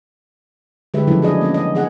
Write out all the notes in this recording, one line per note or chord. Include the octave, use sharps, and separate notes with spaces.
D3 G#3 G4 B4 E5
C#3 F3 F#3 A3 E4 A4
D4 G#4 D#5
A#3 B3 C#4
D#5
E3 B3 G#4 F#5